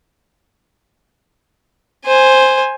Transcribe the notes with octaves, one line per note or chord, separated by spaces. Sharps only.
C5 G#5